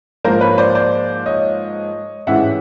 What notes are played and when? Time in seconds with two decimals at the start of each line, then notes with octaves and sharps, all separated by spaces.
0.24 G#2 F3 A#3 A#4 C5
0.41 B4 C#5
0.58 C5 D5
0.75 C5 D5
1.26 C#5 D#5
2.27 A1 G#2 E3 G#3 C#4 E5 F#5